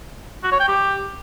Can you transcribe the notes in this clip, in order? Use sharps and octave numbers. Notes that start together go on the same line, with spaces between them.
F#4
C#5
G5
G4